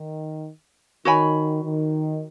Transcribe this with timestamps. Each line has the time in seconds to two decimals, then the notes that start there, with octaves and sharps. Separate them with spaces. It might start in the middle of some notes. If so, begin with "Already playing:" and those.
Already playing: D#3
1.05 D#3 F#4 C#5 G#5 B5
1.63 D#3